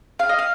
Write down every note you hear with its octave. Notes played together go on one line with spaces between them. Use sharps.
F5
D#5
F5